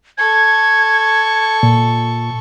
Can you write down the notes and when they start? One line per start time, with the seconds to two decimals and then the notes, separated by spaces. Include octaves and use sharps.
0.18 A4 C#6 G#6
1.63 A#2